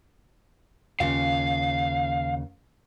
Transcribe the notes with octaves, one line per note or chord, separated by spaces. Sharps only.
D#2 C#3 F4 F5